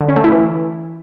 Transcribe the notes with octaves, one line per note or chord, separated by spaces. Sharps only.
D3
C#4
A3
E4
E3